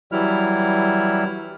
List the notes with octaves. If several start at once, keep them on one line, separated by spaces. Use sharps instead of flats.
E3 F#3 G3 E4 F6